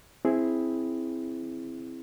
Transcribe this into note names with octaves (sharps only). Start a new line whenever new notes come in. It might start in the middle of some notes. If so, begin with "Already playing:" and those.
C4 E4 G#4